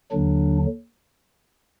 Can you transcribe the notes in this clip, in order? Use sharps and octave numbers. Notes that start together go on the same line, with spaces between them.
D#2 D3 F#3 D4